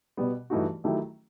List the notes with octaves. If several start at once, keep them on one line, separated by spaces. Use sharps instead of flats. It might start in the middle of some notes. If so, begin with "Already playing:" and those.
B2 G3 B3
G2 E3 A3 D#4 F#4
D#3 F#3 A3 E4 G4